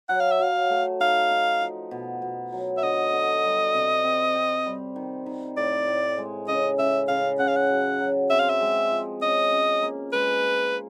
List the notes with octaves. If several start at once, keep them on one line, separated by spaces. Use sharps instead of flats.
F#3 F#5
F5
E5
F#3 F5
A3
D#4 F5
D#4
F3
B2
B2
F#3
E5
D3 D#5
D3
G3
C3
C4
C4
G3
D#3
D#3
A2 D5
A2
G#3
C#3 D#5
C#3 E5
C#3 F5
C#3 F#5
F5
F#5
F#3
F#3
C4 E5
F5
E5
G#3
F3
C#4 D#5
C#4
A#3
G#3 B4
F4